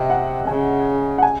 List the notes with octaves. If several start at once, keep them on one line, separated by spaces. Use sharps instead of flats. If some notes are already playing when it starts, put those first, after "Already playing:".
Already playing: C3 D#5 E5
F#5
C#3 G#5
F#5
G#5